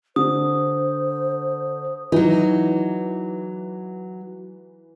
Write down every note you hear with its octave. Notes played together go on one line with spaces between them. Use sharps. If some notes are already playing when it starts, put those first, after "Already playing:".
D3 C5 D#6
E3 F#3 D#4